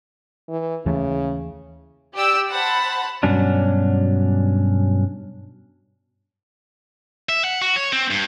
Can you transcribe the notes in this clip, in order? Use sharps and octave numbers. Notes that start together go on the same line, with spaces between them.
E3
D#2 C#3 E3 A3
G4 D5 G5 E6
C5 F#5 A5 B5
G2 B2 F#3 C#4 D4
E5
F#5
F#4
C#5
C4
G2